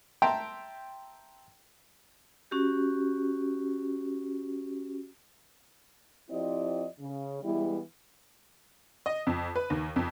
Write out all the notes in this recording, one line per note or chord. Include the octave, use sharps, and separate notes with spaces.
E5 G5 A5 A#5 C6
C#4 F#4 G4
F3 C4 E4 G4 D5 D#5
C#3
E3 G3 G#3 B3 E4
D#5
F2
B4
D#2
F2